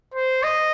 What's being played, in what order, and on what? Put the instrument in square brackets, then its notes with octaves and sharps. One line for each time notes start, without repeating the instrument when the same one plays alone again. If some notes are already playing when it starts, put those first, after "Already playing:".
[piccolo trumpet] C5
D#5